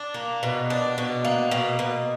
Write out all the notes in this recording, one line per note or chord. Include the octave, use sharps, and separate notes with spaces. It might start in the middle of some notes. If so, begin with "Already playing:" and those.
Already playing: D4
A#3
B2
D4
B2
A#3
B2
B2